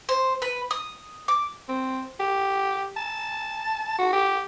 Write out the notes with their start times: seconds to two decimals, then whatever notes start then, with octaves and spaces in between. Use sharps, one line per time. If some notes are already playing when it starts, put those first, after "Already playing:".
0.09 C5
0.42 B4
0.71 D#6
1.28 D6
1.69 C4
2.20 G4
2.97 A5
3.98 F#4
4.13 G4